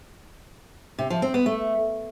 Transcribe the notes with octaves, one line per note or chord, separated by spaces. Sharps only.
C3
F3
C4
B3
A3